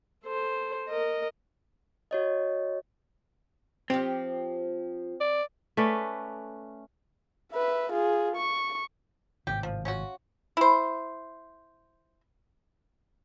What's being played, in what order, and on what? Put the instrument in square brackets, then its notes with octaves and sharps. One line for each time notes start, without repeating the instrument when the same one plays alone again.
[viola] A4 C5
A#4 D#5
[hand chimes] F#4 C#5 D#5
[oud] F3 G4 [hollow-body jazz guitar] C4
[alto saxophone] D5
[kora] A3 C#4 B4 D5
[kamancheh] B4 E5
F4 G#4
C#6
[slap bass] G#1 A2 C3 [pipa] G4
[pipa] F3
C#4 F4 F#4
E4 C5